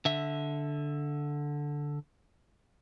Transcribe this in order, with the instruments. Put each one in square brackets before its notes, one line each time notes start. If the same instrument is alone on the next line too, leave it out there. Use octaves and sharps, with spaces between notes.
[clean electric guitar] D3 E5